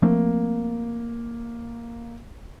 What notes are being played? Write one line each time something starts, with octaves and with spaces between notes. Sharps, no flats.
F3 A3 A#3 C4